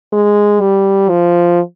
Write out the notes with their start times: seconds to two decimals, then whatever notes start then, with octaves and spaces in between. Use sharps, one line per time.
0.13 G#3
0.61 G3
1.09 F3